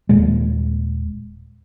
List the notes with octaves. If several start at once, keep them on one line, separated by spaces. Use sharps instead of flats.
D#1 D#2 A#2 G#3